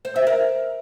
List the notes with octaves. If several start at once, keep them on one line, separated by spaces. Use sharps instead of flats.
C5
E5
A#4